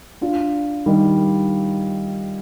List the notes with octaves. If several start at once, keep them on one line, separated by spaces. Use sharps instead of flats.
D4 F4
D#3 G3